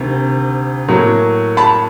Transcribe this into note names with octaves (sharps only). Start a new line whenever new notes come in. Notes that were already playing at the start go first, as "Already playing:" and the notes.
Already playing: D2 C3 D#3
A2 F#3 A#3
A5 B5